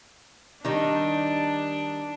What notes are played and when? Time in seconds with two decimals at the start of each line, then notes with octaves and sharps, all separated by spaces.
0.65 D#3 G3 D4 D#4